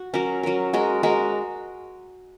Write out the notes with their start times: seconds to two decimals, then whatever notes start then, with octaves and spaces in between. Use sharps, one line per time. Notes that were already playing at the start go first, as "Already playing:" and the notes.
Already playing: F#4
0.14 F#3 C#4 A#4
0.43 F#3 C#4 A#4
0.73 G#3 F#4 A#4
1.03 G#3 F#4 A#4